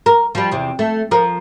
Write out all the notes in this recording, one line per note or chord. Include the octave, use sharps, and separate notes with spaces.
A#4
F3 G3
E2 C3
A3
F3 A#4